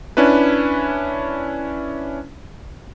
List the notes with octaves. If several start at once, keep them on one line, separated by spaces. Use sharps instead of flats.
C#4 D4 E4 B4